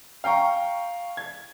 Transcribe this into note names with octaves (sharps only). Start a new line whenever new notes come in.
F5 G5 A#5 C#6
G#6